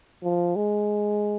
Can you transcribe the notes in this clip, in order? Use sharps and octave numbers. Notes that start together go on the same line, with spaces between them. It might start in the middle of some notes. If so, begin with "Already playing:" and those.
F3
G#3